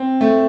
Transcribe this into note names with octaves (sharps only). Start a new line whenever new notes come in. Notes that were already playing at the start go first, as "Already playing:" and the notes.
Already playing: C4
A3